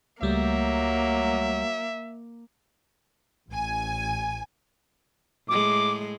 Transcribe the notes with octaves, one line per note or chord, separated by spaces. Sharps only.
C#2 F#3 G3 A3 A#3 E5
A1 G#5
A2 G#3 D6